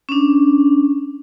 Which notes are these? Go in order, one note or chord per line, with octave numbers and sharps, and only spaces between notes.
C#4 D4